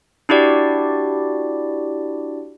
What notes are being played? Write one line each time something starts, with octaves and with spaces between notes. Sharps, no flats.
D4 E4 F#4 G4 D5